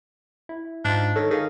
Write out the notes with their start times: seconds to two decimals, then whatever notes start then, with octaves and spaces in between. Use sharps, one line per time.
0.49 E4
0.85 G#2 D4 D#4 F4
1.16 D#3 A4 C#5
1.30 D#3 G#4 F5